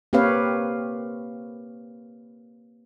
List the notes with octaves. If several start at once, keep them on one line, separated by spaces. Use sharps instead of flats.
A#3 C4 G4 B4 C#5 F5